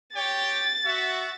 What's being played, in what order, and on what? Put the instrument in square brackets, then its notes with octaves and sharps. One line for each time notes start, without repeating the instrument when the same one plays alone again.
[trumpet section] G4 C#5 G5 [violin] A6
[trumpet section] F#4 E5